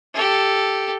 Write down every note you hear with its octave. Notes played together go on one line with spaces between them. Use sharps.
G4 A4